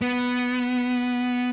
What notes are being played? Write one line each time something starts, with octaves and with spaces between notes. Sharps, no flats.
B3